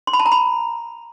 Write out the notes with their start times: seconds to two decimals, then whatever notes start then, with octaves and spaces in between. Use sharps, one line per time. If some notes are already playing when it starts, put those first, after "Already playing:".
0.07 C6
0.13 B5
0.20 A5
0.26 A#5
0.32 B5